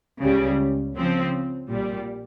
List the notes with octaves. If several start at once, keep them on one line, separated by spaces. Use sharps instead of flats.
C#2 C#3 G3
C#3 F3 C4
A#1 A#2 G3